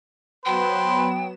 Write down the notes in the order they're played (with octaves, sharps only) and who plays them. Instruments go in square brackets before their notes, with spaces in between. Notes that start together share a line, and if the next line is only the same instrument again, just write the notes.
[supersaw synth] F#3 B3 E7 [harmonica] B4 C5 [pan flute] G5